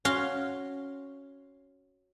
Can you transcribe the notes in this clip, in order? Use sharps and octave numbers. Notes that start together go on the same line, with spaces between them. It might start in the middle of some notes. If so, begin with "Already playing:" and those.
C#4 F#4 F5 C6